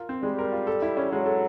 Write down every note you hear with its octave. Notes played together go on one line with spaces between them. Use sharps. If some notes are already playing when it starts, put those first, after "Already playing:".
Already playing: F4 A#4
C4
G3 G#3
A#4
F4
A4
E4
C#4
F#3 G#3
A4